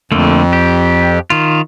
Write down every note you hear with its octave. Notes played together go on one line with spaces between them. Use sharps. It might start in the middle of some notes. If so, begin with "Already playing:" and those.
F2 D3 A3 A#3
G4
D#3 F4